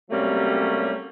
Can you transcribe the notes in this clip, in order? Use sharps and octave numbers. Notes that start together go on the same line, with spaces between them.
C3 F#3 G3 A3 A#3 C#4